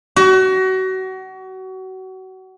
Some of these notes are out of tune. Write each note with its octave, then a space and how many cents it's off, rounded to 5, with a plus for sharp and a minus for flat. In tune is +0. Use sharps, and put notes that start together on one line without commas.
F#4 +30